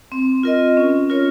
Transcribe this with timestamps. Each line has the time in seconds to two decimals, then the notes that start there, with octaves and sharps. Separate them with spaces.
0.12 C4
0.43 F4 A#4 D#5
0.77 C#4
1.10 F4 A#4 C#5